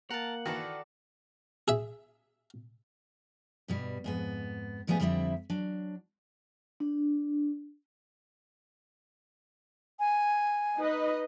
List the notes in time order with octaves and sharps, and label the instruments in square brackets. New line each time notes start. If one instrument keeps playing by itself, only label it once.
[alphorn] A#3 [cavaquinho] A#4 A5 [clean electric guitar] F#5
[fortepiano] D#3 E3 [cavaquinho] F#4 A4 D5
[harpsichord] G#4 E5
[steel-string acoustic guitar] G2 B2 G3
F2 G#2 B3
A2 F3 G3 A3 B3 G#4
F2 D3 G3 C4 E4 E5
F#3 D4
[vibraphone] D4
[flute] G#5
[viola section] D#4 B4 D#5